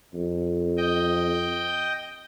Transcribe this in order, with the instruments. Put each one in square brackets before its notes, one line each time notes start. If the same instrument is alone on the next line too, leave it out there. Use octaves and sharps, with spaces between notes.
[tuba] F2
[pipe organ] D#5 G5